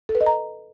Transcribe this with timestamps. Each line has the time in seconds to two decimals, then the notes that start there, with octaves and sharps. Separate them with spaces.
0.09 A4
0.15 B4
0.21 D#5
0.26 A#5